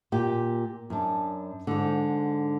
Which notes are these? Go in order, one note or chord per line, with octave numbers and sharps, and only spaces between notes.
A#2 G4
F#2 D4
G#2 D3